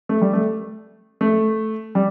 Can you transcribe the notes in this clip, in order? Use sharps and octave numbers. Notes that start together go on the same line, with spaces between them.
A3
G3
A3
A3
G3